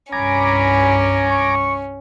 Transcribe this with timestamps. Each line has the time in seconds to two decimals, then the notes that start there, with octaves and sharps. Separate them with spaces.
0.12 C2 G2 C#4 G#5 A#5 B5 D6
1.29 C#6